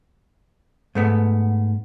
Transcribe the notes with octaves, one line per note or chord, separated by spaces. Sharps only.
G#2 A3 B3